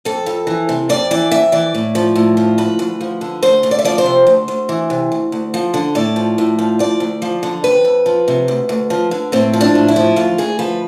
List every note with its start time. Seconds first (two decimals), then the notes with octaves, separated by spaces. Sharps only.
0.05 F2 A4
0.26 F2
0.47 E3
0.69 C3
0.89 F2 D5
1.11 E3 D5
1.31 F2 E5
1.52 E3 D5
1.74 A2
1.95 F3
2.15 A2
2.37 F3
2.58 D2 B4
2.79 D2
3.01 F3
3.21 D3
3.43 D2 C5
3.63 D2
3.71 D5
3.79 E5
3.85 F3 D5
3.98 C5
4.06 C3
4.27 D2
4.48 D2
4.69 E3
4.90 C3
5.12 D2
5.32 D2
5.54 F3
5.74 D3
5.95 A2 D5
6.16 F3
6.38 A2
6.59 F3
6.79 D2 D5
7.00 D2
7.22 F3
7.43 D3
7.64 F2 B4
7.84 F2
8.06 F3
8.28 C3
8.48 D2
8.69 D2
8.90 F3
9.11 D3
9.32 A2 C4
9.53 F3
9.61 D4
9.75 A2
9.88 E4
9.96 F3
10.16 D2 F4
10.38 D2 G#4
10.59 F3 B4